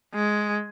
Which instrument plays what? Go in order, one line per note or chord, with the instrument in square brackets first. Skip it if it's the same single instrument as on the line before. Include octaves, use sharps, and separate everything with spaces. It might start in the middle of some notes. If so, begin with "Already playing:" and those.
[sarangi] G#3